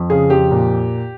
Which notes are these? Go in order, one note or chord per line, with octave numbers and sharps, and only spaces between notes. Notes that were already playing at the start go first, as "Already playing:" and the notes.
Already playing: F2
C#3 G#4
F2 G4
A#2